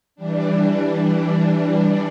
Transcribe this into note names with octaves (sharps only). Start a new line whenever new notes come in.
E3 G3 D4